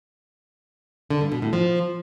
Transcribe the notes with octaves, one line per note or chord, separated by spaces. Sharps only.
D3
G2
B2
A2
F3